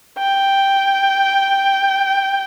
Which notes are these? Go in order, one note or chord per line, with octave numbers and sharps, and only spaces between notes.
G5